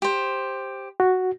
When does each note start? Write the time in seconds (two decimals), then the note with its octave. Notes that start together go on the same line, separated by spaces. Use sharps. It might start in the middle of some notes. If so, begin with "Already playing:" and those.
0.02 G4 C5
1.00 F#4